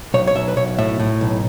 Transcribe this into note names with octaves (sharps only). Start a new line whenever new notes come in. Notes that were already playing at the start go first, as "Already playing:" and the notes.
B1 C#5
C#5
B1 E5
B4
B1 C#5
A2 E5
A2
B1